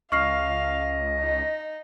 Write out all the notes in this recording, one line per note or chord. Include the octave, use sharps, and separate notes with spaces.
C#2 D#5 F5 C#6 F6 C7
D#4